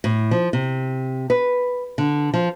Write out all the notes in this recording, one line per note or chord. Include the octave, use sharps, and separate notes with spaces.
A2
F3
C3
B4
D3
F3